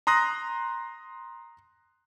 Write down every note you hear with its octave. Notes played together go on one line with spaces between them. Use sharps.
A#5 C6 D#6 F#6 A#6